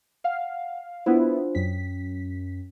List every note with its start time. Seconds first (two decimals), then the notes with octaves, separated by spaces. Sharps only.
0.24 F5 F#5
1.06 B3 D4 E4 F4 C5
1.55 F#2 C#4 B6